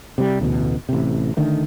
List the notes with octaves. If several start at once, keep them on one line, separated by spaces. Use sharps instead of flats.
C3 G3
A1 D2 B2
A1 C3
D3 D#3 A3